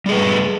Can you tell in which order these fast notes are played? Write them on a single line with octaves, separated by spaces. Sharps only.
G3 G#4 B4 A3